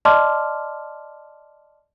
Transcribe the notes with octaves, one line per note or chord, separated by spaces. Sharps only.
D5 D#5 A5 C6 D6 F6